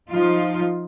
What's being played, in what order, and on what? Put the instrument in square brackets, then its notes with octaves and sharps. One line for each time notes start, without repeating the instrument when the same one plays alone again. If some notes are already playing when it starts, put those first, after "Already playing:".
[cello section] F3 D#4 F4